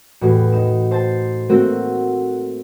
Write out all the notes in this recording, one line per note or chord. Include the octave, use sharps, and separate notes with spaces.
E2 A2 F#4 G4
D#4 E7
C5 A5
A3 A#3 C4 F#4 A#4